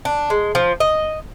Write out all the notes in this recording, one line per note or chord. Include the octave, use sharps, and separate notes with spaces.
D4
G#3
F3
D#5